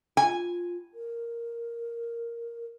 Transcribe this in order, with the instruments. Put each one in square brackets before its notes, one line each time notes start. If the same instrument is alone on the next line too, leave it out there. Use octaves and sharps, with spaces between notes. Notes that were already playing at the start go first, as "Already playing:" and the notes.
[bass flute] F4 [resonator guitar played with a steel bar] G#5
[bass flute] A#4